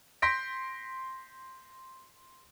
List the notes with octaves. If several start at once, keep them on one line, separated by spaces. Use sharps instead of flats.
C6 G6 A#6 B6 D7